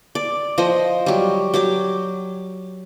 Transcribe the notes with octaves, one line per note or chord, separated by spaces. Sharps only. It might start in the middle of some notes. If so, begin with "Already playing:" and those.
D5
F3 C5 D#5
F#3 G3
F#3 G4 D6